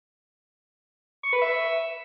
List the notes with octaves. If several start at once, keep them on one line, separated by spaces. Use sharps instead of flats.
C#6
B4
E5